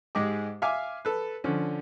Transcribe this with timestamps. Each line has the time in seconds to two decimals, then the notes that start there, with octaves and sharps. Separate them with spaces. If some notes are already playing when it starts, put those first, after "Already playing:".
0.15 G#2 G#3 G4 G#4 D#5 D6
0.62 E5 F5 G#5 D6
1.05 A4 B4
1.44 D3 F3 C#4